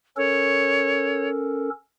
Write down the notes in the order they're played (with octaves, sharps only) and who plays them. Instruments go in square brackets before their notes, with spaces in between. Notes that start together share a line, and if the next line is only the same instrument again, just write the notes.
[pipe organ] C#4 A4 A#4 [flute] C#5